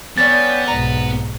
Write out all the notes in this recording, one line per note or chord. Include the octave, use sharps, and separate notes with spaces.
G3 B3 C#4 D4 A6
B1 G#2 A#5